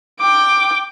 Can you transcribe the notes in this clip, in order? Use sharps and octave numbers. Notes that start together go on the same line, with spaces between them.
G5 D6